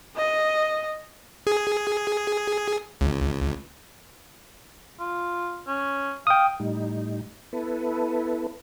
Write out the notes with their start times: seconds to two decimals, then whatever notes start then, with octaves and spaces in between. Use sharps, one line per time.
0.16 D#5
1.47 G#4
3.01 C#2
5.00 F4
5.67 C#4
6.27 F5 G5 D#6
6.60 A2 G3 D#4
7.53 B3 E4 A4 B4